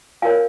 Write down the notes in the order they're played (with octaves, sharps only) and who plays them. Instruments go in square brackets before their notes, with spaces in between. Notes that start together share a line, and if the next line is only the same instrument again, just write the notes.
[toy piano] F4 A#4 C#5 F5 G#5